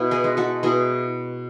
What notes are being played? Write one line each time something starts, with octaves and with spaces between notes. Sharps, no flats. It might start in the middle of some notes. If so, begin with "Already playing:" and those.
Already playing: B2 E4
G#4 B4
G#3
F#4 A4
B2 E4 G#4